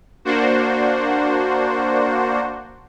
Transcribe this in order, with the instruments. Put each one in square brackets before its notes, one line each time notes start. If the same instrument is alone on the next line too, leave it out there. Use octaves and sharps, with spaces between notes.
[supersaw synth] A#3 D4 F#4 C5